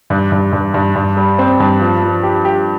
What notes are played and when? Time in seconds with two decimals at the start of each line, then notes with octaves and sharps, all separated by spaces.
0.10 G2
0.32 G2
0.53 G2
0.74 G2
0.95 G2
1.17 G3
1.39 C4
1.60 G2
1.81 F3
2.02 F3
2.23 G4
2.45 G4